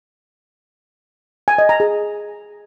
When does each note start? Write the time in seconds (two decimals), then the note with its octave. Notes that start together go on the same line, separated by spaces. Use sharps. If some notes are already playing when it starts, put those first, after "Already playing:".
1.48 G#5
1.58 D#5
1.69 A#5
1.80 G#4